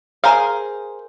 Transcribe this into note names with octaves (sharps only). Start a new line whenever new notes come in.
G#4 A#4 C5 F5